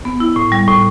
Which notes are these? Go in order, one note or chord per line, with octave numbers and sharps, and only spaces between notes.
B3
E4
A2
G3
A2